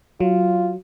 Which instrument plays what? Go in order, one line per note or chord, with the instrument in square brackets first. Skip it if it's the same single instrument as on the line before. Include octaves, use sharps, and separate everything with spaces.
[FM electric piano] F#3 [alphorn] F4